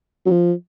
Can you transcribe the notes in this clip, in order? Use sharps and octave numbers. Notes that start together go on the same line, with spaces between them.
F#3
F3